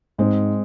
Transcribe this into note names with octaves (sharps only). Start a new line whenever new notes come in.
G#2 G#3 C4